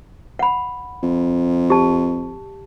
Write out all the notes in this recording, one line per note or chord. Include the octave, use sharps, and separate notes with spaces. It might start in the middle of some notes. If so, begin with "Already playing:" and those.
F#5 B5
F2
G4 A5